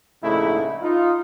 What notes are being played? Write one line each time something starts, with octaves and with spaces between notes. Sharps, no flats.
A#1 G#2 C#3 A3 D#4 E4
D#4 F4